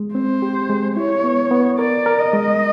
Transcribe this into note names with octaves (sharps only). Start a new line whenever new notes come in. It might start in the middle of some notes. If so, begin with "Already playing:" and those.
Already playing: G#3
C4 C5
G4
G#3
E4 C#5
B3
B3
A#4 D5
A#4
D#5
G#3